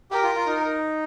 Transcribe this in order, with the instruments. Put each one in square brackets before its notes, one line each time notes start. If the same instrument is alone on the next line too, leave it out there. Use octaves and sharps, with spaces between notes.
[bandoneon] G4 [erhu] A#4
[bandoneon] F4
F4
D#4